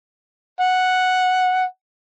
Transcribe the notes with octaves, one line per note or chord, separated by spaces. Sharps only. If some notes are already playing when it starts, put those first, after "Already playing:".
F#5